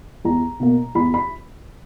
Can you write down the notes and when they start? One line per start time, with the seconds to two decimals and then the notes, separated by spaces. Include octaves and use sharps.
0.25 E2 A#5
0.60 B2 A#3
0.95 E2 B5
1.14 B5